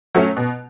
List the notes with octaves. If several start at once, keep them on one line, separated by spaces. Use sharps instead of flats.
F#3 A3 C#4
B2